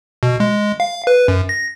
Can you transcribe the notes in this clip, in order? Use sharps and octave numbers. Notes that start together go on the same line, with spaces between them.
B2
G#3
F5
B4
F#2
A#6